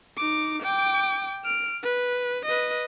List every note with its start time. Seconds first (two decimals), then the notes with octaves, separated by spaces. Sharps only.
0.18 D#4 D6
0.63 G5 D6
1.44 F6 D7
1.83 B4
2.45 B4 D#5